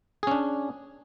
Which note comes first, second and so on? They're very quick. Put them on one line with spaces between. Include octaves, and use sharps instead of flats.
G#4 C#4 D4